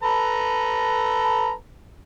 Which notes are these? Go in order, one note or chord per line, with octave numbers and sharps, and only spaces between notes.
A4 B4 A#5